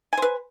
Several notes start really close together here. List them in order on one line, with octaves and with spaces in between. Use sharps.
G#5 C5 B4